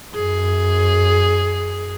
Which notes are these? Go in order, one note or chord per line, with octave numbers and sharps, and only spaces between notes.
F#2 G#4